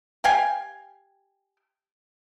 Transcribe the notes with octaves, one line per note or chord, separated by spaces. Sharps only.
G4 F5 G5 G#5